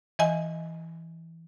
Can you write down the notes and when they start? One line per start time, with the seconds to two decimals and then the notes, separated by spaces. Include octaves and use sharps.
0.19 E3 D#5 G#5